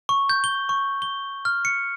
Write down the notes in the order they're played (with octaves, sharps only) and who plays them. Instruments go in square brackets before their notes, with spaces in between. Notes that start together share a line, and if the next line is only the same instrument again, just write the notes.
[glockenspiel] C#6
G6
G7
C#6
G7
F6
C#7